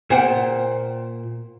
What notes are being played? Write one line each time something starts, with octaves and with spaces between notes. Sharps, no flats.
A#2 C5 F#5 G5